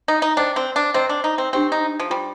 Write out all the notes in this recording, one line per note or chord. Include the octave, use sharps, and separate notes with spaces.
D#4
D#4
D4 C5 D#5 G5
C4
D4
C4 C5 D#5 A#5
D4
D#4
C4
C4 D4 G4 C5 G5
D#4
F3
G3 F4 C5 G5 C6